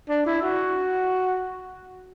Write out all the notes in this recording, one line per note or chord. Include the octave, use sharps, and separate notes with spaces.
D4
E4
F#4